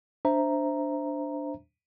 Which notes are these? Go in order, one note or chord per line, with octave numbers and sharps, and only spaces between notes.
D4 C5 E5 A#5